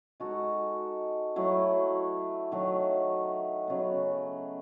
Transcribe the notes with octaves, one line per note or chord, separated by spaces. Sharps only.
G#3 D#4 F#4 A4
F#3 A3 E4
D#3 F#3 A3
C#3 F#3 B3